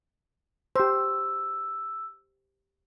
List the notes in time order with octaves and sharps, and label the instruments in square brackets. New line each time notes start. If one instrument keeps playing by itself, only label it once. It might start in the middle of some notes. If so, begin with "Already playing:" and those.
[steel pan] G4 C5 [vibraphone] E6